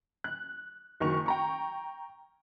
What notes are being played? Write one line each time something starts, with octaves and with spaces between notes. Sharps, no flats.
F#6
F#1 D#3 F#4 C#6 F7
G5 A#5 C#6